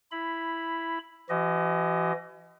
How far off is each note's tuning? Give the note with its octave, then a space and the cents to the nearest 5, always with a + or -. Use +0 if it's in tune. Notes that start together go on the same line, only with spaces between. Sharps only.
E4 +5 B5 +0
E3 +40 F#4 +45 D#5 +0